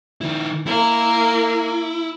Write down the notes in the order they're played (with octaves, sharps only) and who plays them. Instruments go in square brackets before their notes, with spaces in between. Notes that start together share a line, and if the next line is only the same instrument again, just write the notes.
[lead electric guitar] D#3 E4
[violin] A#3 [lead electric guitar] E4